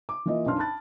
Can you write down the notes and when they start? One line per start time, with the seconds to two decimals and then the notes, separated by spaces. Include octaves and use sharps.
0.09 D6
0.26 E3 A#3 F4 D#5
0.46 B1 F#2 D4 B4 C6 F6
0.58 A5 B5 F#6 A6